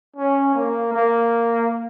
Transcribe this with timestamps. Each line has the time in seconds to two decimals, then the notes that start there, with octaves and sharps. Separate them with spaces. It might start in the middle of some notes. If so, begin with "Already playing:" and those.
0.16 C#4
0.55 A#3
0.93 A#3